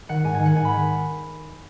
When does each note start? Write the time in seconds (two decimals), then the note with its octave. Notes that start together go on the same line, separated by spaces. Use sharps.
0.09 D#3 F#5
0.24 G#2 G#5
0.35 D#3 G#5
0.45 F#5
0.55 G#2 G#5
0.65 B5
0.70 D#3